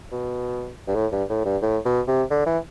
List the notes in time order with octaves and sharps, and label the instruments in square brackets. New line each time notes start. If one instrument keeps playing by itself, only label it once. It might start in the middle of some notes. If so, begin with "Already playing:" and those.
[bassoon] B2
G2
A2
G2
A2
G2
A2
B2
C3
D3
E3